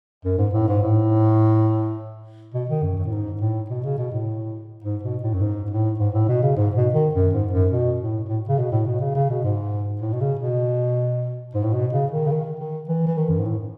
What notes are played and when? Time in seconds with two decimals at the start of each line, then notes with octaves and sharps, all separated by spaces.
0.25 F#2
0.38 G#2
0.54 A2
0.68 G#2
0.82 A2
2.54 B2
2.69 D#3
2.82 F#2
2.97 F#2
3.05 A2
3.12 G#2
3.41 A2
3.70 B2
3.84 C#3
3.98 B2
4.12 A2
4.84 G#2
5.03 B2
5.23 A2
5.33 F#2
5.41 G#2
5.70 A2
5.99 G#2
6.14 A2
6.28 B2
6.42 C#3
6.56 G#2
6.75 B2
6.94 D#3
7.14 F#2
7.33 G#2
7.52 F#2
7.71 B2
8.00 A2
8.29 A2
8.49 C#3
8.58 B2
8.71 A2
8.86 B2
9.00 C#3
9.15 C#3
9.30 B2
9.44 G#2
10.01 A2
10.13 B2
10.20 C#3
10.39 B2
11.54 G#2
11.63 A2
11.73 B2
11.93 C#3
12.11 D#3
12.27 C#3
12.31 D#3
12.59 D#3
12.88 E3
13.07 E3
13.17 D#3
13.29 F#2
13.38 G#2
13.45 A2